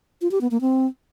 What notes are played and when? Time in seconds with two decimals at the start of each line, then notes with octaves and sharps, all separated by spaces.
0.21 F4
0.31 G4
0.41 B3
0.51 A#3
0.61 C4